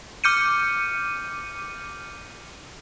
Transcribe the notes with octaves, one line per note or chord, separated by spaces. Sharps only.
D6 F6 G6 C#7 D#7